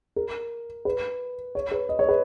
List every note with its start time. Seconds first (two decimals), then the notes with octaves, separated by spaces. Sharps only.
0.16 A#4
0.85 B4
1.55 C#5
1.71 B4
1.89 D#5
1.99 C#5
2.09 B4